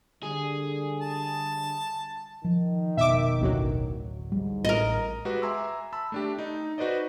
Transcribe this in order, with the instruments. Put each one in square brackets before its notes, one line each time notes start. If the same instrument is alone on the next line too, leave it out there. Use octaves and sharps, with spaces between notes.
[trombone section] D3 G3 [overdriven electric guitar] G#4
[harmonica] A5
[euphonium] D#3 [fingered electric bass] F3
[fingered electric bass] F1 B2 [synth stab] E5 D6
[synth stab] A1 D2 F#3
[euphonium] G#2 [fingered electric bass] G3
[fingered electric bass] A1 [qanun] A#4 D#5
[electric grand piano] G#3 F#4 G4 B4
E5 G#5 A#5 C6 D6 E6
A5 B5 E6
A3 D4 G4
D#4
D#4 F#4 B4 C5 D5 D#5